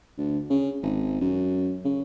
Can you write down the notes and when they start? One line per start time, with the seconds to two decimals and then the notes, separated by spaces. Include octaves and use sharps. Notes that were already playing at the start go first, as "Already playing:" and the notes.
0.18 D2
0.50 C#3
0.83 G#1
1.21 F#2
1.85 C#3